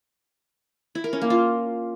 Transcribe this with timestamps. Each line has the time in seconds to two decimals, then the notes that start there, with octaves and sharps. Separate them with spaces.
0.95 E4
1.04 A#4
1.13 C#4
1.22 A#3
1.30 F4